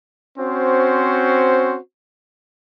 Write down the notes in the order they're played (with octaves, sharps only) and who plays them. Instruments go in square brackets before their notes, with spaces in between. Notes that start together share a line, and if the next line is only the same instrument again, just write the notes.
[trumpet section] C4 C#4 F#4 C5